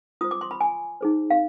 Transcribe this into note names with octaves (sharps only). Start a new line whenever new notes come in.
F4 C5 D#6
D6
C6
B5
G#5
D#4 G#4 C5
F5